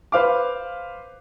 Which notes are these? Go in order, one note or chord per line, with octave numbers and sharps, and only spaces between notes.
B4 C5 F5 D6